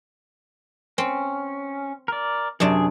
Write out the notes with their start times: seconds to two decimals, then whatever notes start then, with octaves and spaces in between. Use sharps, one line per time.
0.98 C4 C#4
2.08 A#4 D5
2.60 F#2 C3 D4 G#4